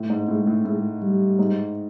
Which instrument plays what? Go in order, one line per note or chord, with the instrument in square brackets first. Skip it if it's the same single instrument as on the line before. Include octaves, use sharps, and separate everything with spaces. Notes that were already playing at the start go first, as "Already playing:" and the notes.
Already playing: [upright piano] A2
G#2
[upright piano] A2 [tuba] G#3
[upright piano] A2
[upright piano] A2 [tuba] G#3
[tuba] G3
[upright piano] G#2